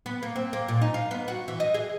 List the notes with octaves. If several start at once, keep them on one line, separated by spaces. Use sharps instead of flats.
B3
A#3
C4
A#3
A#2
D#4
F4
B3
F#4
E3
D#5
G#4